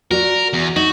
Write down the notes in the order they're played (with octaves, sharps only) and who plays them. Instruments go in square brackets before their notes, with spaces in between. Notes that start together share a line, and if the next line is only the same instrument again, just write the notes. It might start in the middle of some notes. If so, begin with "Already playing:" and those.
[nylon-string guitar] F#4 D5 [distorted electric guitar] A#4
[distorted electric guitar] E2
[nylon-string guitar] D#4 [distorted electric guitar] F#4